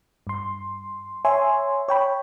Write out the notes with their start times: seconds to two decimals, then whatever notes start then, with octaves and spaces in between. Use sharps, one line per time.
0.27 G2 C6
1.25 C#5 E5 G#5 C6
1.88 C#5 G5 B5